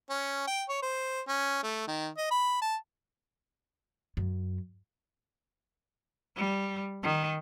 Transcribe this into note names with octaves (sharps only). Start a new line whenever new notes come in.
C#4
G5
C#5
C5
C#4
A3
D#3
D#5
B5
A5
F#2
G3
D#3